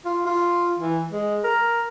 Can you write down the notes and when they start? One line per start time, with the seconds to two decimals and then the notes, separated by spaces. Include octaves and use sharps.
0.05 F4
0.26 F4
0.79 E3
1.10 G#3
1.44 A#4